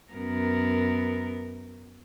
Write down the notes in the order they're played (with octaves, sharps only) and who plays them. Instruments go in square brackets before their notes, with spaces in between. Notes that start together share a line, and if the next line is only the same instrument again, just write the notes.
[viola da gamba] F#2 B3 A#4